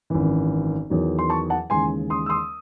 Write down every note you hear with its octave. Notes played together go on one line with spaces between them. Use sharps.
G#1 F#2 E3
E2 D#3 F#3
C6
A5 C#6
F#5 A5
D#2 C#3 E3 G#3 G#5 C6
C6 D#6
E6
C6 D#6